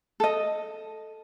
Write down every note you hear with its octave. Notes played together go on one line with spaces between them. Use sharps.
A4 D#5